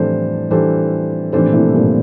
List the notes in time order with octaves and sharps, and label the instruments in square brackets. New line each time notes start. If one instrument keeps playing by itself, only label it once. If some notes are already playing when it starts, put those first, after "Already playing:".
Already playing: [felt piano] F2 A2 [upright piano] E3 G3 D4 A4 C5
[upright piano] E3 G3 D4 A4 C5
[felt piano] F2 A2 [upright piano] E3 G3 D4 A4 C5
[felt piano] A#2
A2 C3
G2 A#2